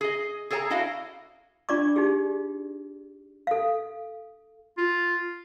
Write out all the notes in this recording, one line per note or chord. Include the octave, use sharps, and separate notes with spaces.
G#4 D#5
G#4 A4 C#5 G5 A#5
D4 E4 F#4 D#5 F5
D4 F4 D5 C#6 D6
D#4 F4 G4 G#4
A4 F5
F4